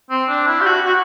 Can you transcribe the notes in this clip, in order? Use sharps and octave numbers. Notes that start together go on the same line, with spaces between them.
C4
D4
E4
G4
F#4
F#4